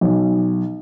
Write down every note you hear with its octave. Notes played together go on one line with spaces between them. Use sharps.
B1